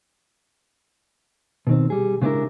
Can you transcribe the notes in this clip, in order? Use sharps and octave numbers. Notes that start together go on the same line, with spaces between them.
B2 D#3 C4
G3 G#4
C#3 G#3 B3 D4 E4 A#4